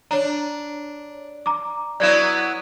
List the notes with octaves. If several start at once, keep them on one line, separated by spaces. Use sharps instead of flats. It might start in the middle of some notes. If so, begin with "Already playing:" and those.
D4 C#5 A#5
A#5 D6
F#3 B3 E4 D5 G#6 E7